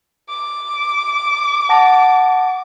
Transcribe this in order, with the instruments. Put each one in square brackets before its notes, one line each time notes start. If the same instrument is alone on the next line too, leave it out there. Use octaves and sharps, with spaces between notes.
[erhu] D6
[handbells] F#5 A5 A#6